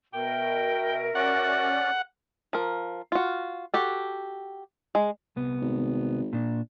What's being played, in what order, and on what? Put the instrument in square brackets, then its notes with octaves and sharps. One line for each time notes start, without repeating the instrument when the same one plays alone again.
[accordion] B2 [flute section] A#4 E5 [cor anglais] G5
[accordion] C#4 D5 [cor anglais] F#4 [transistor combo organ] F#5
[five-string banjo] F3 A#4
F4 F#4
F#4 G4 A4
G#3
[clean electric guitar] C2 B3
[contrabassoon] G#1
[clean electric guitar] A#2 D4